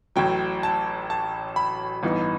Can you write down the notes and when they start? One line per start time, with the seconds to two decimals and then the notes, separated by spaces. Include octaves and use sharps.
0.16 A1 A2 F#3 G5
0.63 A5
1.10 A5
1.56 B5
2.03 A1 G2 E3 B3 D#4